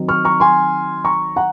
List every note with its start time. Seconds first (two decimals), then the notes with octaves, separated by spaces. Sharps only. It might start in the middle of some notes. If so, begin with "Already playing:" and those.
Already playing: D#3 F#3 C4 D#4
0.08 C#6 F6
0.25 A#5 C#6
0.40 G#5 C6
1.05 A#5 C#6
1.36 F#5 A#5